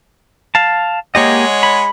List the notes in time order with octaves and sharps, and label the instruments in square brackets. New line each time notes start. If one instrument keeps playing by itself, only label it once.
[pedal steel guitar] F5 A5
[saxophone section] G#3 C#5 F#5 [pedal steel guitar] A#3 G4 D#5
[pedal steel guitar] B5